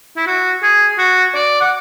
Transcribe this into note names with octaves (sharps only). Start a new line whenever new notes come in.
E4
F#4
G#4
F#4
D5
F#5